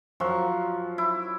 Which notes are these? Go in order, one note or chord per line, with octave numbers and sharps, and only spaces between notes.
F#2 F3 F#3 C#6
E4